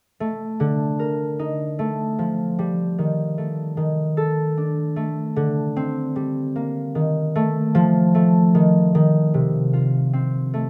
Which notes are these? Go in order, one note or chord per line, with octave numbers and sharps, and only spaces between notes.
A3
D3
A#4
D#4
A3
F3
G3
D#3
A3
D#3
A4
D4
A3
D3
C4
G3
A#3
D#3
A3
F3
A3
D#3
D#3
C3
F4
C4
A3